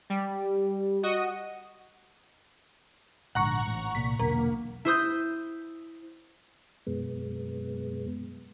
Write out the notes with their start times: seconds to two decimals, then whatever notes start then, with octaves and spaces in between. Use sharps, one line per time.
0.10 G3
1.03 F#4 D#5
3.35 A#1 G#2 D3 F#5 A#5 C#6
3.67 A1 A2
3.95 C2 A#2 B6
4.19 E1 B1 D3 A#3
4.85 E4 C5 D#6 G6
6.87 F#2 B2 G#3 B3